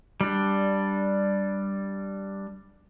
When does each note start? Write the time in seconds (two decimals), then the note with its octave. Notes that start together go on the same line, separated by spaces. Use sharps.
0.21 G3 D4